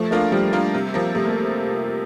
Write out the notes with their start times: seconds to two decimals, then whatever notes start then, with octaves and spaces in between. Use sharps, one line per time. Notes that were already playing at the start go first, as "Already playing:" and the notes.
Already playing: F3 A3
0.11 A3 A#3 D4 F4 A#4
0.32 F3 G3
0.53 A#3 D4 F4 A#4
0.74 C3
0.94 F3 A#3
1.15 C3 A3
1.25 A#3
1.32 A3